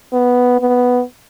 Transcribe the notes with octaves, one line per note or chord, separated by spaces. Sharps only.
B3
B3